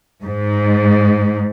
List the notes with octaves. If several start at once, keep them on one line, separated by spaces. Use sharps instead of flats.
G#2